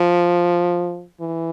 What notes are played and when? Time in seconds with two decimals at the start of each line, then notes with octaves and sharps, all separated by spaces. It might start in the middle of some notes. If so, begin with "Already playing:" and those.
Already playing: F3
1.21 E3